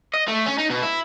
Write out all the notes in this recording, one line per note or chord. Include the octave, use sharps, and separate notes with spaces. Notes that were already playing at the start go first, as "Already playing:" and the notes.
D#5
A3
C#4
D#4
B2
E4